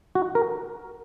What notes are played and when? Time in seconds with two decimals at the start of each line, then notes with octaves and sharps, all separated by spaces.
0.15 F#4
0.35 A#4